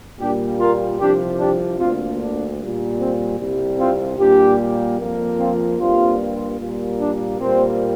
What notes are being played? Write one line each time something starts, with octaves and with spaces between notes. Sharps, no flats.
A#2 G3 A#3 D4 G4
F4 A#4
C2 C3 F3 D4 G4
D4 G4
D2 D3 A#3 C4 F4
D4
A#2 G3 A#3
C4
C2 C3 G3
C4 F4
A#2 G3 A#3 D4 G4
F2 F3 A#3
C4 F4
G2 G3 A#3 C4 F4
A#2 G3 A#3
D4
A#2 G3 A#3 C4